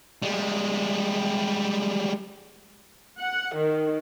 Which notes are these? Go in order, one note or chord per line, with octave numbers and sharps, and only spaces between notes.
G3 G#3
F#5
D#3